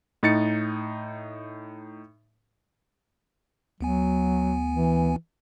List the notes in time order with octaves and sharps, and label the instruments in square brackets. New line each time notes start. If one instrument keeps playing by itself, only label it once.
[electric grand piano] A2 D#4 A6 C#7
[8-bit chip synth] D2 B3 G#5 [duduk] F#3
[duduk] E3